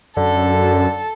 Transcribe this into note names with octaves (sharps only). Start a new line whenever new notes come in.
F#2 D3 A4